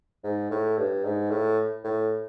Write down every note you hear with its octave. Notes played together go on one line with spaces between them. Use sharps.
G#2
A2
G2
G#2
A2
A2